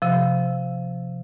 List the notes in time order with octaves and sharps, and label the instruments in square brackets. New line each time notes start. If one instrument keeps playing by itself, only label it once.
[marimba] C3 F3